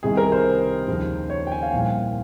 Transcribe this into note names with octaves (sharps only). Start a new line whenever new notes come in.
C2 C3 D#3 G#4
A#4
C5
D#2 C#3 F3
C#5
G5
G#5
F5
C2 A#2 F3